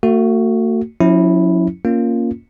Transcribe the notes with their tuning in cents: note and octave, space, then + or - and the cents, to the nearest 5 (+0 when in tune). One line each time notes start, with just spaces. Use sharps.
A3 +45 F#4 +0
F3 +45 C#4 +0 E4 -10
A#3 +0 C#4 +0 F4 +0